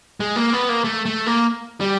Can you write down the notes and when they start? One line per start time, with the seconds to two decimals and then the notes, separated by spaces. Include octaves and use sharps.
0.20 G#3
0.36 A#3
0.53 B3
0.69 A#3
0.84 A3
1.05 A3
1.26 A#3
1.81 G3